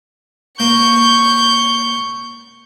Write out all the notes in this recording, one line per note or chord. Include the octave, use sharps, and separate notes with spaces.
A#3 C#6 G6